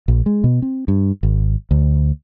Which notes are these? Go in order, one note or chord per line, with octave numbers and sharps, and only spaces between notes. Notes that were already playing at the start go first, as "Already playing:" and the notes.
A#1
G#3
B2
C4
G2
G#1
D2